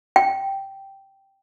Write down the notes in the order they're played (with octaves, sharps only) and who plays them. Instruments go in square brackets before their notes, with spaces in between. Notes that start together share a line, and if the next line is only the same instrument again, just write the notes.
[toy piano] G5